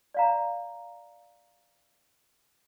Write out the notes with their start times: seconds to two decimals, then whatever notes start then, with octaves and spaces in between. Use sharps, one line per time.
0.14 D5 F5 A#5